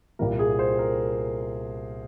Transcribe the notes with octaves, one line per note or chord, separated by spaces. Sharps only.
C2 A#2 G3 A#4
G#4
C5
A#4